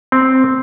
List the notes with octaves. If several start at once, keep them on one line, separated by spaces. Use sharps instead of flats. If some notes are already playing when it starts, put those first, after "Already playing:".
C4